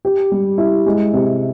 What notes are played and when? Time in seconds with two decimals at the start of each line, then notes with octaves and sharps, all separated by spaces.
0.05 G4
0.32 G3
0.58 E4
0.86 G#3
1.13 C3